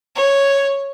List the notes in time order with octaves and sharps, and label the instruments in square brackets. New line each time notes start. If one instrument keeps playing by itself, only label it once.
[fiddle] C#5